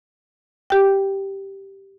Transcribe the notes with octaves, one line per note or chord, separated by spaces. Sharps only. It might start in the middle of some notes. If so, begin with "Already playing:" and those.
G4 G5